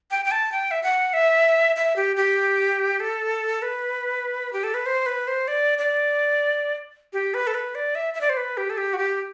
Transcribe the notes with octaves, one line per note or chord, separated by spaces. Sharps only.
G5
G5
A5
G5
E5
F#5
E5
E5
G4
G4
A4
B4
G4
A4
B4
C5
B4
C5
D5
D5
G4
B4
A4
B4
D5
E5
E5
D5
C5
B4
G4
A4
G4
F#4
G4